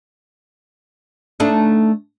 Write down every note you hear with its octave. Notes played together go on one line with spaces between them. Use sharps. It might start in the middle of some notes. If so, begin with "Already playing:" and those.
A3 D4 D#4